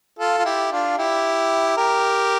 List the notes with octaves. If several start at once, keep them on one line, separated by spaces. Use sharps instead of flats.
F4 A4
F4
E4 G4
D4 F4
E4 G4
G4 A#4